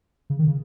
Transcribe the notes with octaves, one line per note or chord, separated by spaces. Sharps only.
C#3
D#3
C#3